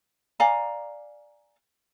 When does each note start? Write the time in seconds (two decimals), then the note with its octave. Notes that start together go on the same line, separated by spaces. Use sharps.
0.40 D5 F5 G#5 A#5